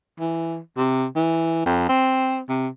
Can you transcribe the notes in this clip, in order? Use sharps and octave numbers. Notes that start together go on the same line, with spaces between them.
E3
C3
E3
F2
C4
C3